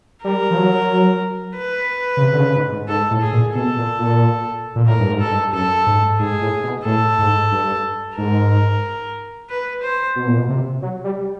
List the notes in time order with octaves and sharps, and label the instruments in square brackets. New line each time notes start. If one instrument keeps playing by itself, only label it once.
[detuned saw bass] G3 [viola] A#4
[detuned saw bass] F3
F#3
[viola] B4
[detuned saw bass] C#3
C3
D3
C#3
G#2
G#2
[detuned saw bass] G#2 [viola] A4
[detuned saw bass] A2
[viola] G#4
[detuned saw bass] A#2
[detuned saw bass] B2 [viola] A4
[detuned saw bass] A#2
A#2
A#2
[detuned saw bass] A2 [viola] A#4
[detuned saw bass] G2
G#2
[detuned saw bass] G#2 [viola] A4
[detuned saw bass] G2
[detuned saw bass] F#2 [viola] A4
[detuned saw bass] G#2
[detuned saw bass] G#2 [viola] G#4
[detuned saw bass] A2
B2
[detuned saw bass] A2 [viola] A4
[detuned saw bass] G#2
G2
[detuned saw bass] G#2 [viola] A#4
[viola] B4
C5
[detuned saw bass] B2
A#2
B2
C3
F#3
G3